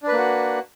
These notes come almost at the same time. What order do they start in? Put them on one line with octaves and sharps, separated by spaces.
D4 B4 A#3 F#4